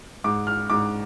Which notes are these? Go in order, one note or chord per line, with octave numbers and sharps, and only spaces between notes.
G#2 D6
F6
G#2 D6